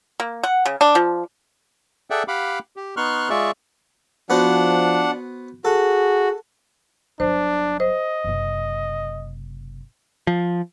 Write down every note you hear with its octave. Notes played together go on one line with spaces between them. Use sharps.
A#3
F#5
C#3
D4
F3
G#4 A4 D5 E5 F#5 G5
G4 F5 F#5 B5 D6
G4
B3 D#4 C6 C#6 F6 F#6
G#3 F4 G#4 D5 E5 C#6
F3 B3 D4 F#4 C5 F#5
F#4 G#4 A4
G1 F#3 D4 C5
C5 D#5
F#1 C3
F3